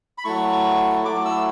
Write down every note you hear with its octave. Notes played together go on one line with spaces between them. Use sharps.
B5
F#3 A3 E4 C#6
F#3 A3 E4 D6
E6